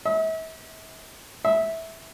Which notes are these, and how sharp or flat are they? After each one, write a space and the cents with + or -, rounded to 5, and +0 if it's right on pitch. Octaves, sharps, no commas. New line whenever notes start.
E5 -40
E5 -15